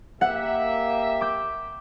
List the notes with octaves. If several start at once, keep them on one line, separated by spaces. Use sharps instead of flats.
A#3 G4 E5 F#5
D6 G6